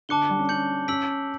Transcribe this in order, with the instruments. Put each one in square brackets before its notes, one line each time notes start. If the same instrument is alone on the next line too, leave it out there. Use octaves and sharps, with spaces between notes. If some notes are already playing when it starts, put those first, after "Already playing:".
[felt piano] D3 [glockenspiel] A5 D6 F#6 C#7 G7
[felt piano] G3
C#4
[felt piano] C#4 [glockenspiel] G6 C#7 F#7
[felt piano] C#4 [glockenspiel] E6 B6 D7 F#7